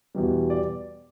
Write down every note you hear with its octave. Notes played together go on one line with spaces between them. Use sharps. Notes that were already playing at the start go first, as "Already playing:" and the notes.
E2 B2 G3
D5